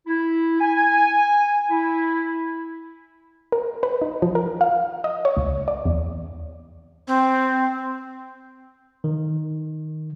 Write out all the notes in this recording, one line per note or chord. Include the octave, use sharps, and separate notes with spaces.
E4
G#5
E4
A#4
B4
D#4
F3
A#4
F5
D#5
C#5
C#2
D5
E2
C4
D#3